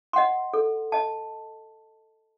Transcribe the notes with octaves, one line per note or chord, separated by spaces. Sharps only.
D#5 F#5 C6
A4
D#5 A5